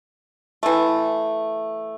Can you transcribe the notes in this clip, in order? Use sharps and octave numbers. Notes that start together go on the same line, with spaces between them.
E3 A3